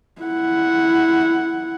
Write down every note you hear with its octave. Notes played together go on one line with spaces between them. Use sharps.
E4 F#5